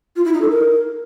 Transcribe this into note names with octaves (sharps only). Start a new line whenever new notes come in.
F4
E4
D#4
A4
A#4